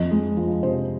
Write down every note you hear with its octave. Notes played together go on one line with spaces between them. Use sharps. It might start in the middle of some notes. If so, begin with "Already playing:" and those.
Already playing: F2 D#5
G#3
F3
C3 C5